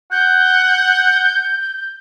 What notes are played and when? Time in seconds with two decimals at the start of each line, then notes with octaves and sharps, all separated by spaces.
0.11 F#5 G6